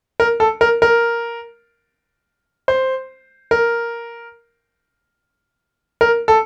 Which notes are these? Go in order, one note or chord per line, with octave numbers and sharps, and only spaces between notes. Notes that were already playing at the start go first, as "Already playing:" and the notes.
A#4
A4
A#4
A#4
C5
A#4
A#4
A4